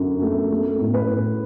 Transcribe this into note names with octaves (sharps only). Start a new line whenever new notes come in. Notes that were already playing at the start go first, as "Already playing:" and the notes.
Already playing: F#2 D3
A3
A3
A2
B4
A2